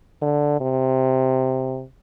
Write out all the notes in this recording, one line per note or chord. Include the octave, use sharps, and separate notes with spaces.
D3
C3